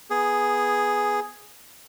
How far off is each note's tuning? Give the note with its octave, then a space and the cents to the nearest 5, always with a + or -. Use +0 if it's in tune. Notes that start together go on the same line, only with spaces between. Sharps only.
B3 +0 G#4 +0